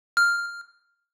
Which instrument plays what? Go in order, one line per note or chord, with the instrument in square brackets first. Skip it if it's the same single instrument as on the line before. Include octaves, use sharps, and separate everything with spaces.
[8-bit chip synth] F6